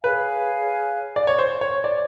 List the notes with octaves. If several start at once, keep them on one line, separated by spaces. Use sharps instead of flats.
G#4 B4 C#5 F5 G#5
D5
C#5
C5
C#5
D5